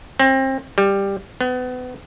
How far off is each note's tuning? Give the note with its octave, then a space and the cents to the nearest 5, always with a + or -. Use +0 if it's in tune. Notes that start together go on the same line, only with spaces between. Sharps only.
C4 +30
G3 +10
B3 +30